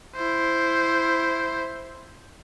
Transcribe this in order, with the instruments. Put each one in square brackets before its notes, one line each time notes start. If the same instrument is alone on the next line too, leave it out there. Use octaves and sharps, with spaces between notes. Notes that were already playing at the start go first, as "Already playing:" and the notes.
[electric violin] E4 C5